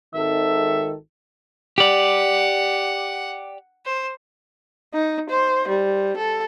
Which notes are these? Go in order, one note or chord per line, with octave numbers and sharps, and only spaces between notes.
G#1 D#3 A4 E5
G4 D5 F#5
C5
D#4
C5
G3
A4